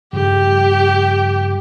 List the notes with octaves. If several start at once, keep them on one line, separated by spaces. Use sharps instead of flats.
G2 C#3 F3 G4